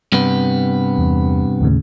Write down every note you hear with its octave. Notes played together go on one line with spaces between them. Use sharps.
G2 C3 B3
E2
D#2 A2 C#3